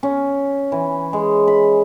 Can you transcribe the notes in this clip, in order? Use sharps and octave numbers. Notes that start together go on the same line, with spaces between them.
C#4
E3
G#3
B5